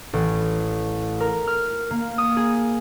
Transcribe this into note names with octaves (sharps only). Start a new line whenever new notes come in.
A1
A#4
F6
A#3
D#6
G#4